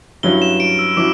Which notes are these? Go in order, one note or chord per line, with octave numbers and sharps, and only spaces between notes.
G2 F#3 C#4 E4 G7
E7
D7
E6
F#3 C#4 E4 D6